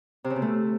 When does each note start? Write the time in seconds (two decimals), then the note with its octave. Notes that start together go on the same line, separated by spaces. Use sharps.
0.24 C3
0.30 C#3
0.36 B2
0.42 A3